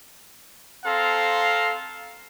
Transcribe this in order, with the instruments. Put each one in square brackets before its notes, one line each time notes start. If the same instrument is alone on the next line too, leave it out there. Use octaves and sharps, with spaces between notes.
[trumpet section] C4 A4 F5 A#5 C6